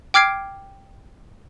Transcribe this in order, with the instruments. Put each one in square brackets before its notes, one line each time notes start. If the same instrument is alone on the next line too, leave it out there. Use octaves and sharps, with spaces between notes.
[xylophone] G5 D6 F6 G#6 C7 D7